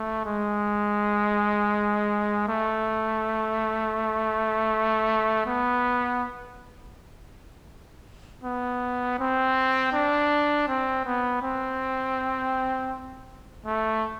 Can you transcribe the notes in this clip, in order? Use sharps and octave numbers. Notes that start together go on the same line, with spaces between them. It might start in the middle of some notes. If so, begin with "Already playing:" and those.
Already playing: A3
G#3
A3
B3
B3
C4
D4
C4
B3
C4
A3